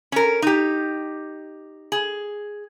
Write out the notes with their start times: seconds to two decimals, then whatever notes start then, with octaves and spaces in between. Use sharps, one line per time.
0.12 C#4 A#4
0.42 D#4 G4
1.92 G#4